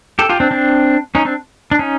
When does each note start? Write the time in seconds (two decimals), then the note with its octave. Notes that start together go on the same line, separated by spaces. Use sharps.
0.19 G4 A4
0.29 F4 G4
0.40 C4 D4
0.51 C4 D4
1.15 C#4 D#4
1.25 C4 D4
1.71 D4
1.79 C#4 D#4